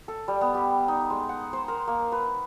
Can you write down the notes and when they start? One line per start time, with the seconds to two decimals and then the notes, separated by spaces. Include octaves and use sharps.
0.08 A4
0.28 G3
0.41 B3
0.54 G4
0.88 D#4
1.10 G#3
1.29 F#5
1.53 C5
1.68 A#4
1.87 A#3
2.12 B4